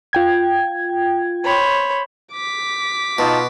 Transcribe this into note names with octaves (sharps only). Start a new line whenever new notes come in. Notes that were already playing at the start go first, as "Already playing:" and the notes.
F4 G5 G#6
C5 C#5 B5
D6 B6
B2 D#4 F4 A5